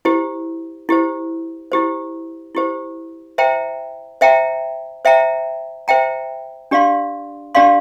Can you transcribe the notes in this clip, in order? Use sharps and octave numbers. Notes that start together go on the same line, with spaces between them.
E4 G4 C5
E4 G4 C5
E4 G4 C5
E4 G4 C5
C5 E5 G5 A#5
C5 E5 G5 A#5
C5 E5 G5 A#5
C5 E5 G5 A#5
D4 G4 D5 F5 C6
D4 G4 D5 F5 C6